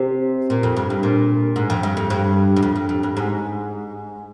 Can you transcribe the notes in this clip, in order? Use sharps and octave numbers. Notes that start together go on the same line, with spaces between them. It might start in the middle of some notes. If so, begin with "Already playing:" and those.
Already playing: C3
A#2
F2
G2
G2
A#2
G#2
F2
G2
F2
G2
G2
F2
G2
F2
G2
G#2